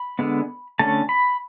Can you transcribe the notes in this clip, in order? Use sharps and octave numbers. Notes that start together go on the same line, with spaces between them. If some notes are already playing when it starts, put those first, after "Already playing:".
Already playing: B5
D3 G#3 B3
D3 A3 C#4 A5
B5